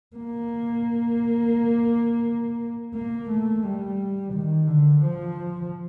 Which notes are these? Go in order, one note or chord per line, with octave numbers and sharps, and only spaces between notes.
A#3
A#3
A3
G3
D#3
D3
F3